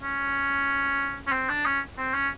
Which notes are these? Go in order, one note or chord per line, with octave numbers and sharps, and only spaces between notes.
C#4
C#4
C4
D4
C#4
C4
C#4